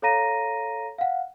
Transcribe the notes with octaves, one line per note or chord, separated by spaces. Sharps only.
A4 C#5 F5 A#5 A#6 D#7
F5 F#5